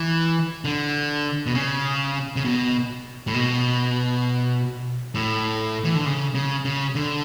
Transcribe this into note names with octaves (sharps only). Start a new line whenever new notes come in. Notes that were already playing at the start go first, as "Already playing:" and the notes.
Already playing: E3
D3
B2
C#3
C#3
B2
A2
B2
A2
E3
D3
C#3
C#3
C#3
D3